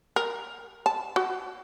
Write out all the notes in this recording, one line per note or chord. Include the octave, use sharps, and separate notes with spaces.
A#4
A5
F#4